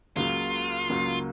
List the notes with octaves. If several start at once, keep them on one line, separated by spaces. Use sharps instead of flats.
C#2 C#3 F#3 A#3 F4
C#2 C#3 F#3 A#3